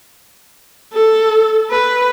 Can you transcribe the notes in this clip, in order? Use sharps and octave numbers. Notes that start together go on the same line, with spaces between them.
A4
B4